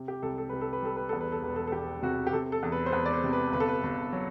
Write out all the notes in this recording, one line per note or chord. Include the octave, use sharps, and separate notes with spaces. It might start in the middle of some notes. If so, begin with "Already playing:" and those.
Already playing: C3
G4
C2 A4
A4
C2 B4
A4
B4
G3 A4
B4
E2 A4
B4
A4
E1 B4
A4
A4
E1 G4
C3 F#4
G4
C3 A4
A4
E2
B4
C5
E2 B4
D5
C5
C3
B4
G1 B4
A4
B4
G1
F#3